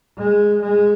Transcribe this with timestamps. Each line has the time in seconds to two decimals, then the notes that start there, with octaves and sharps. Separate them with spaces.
0.18 G#3
0.62 G#3